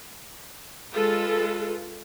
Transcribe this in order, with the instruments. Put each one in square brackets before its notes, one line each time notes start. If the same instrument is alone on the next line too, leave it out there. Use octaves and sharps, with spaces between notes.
[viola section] G#3 F4 A4 B4